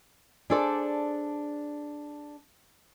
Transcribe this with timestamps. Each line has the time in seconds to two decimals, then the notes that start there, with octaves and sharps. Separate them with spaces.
0.50 D4 G#4 A4 C5 D5